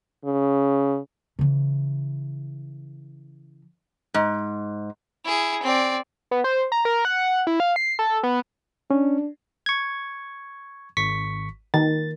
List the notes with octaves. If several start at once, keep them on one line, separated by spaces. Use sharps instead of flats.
C#3
C#3 E3
G#2
E4 G#4
C4 D5
B3
C5
A#5
A#4
F#5
E4
F5
C7
A4
B3
C#4 D4
C#6 G#6
G#1 C#6 B6
D#3 A6